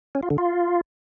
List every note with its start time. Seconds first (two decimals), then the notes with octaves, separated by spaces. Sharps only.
0.15 C#4
0.23 F4
0.30 D3
0.38 F4